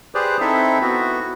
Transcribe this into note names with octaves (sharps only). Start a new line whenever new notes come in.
G4 G#4 B4 C5 D5
C4 D#4 E4 A4 E5
B3 F#4